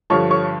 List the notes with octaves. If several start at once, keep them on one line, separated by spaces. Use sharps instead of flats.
G2 D3 F3 C#5 C#6
C#5 C#6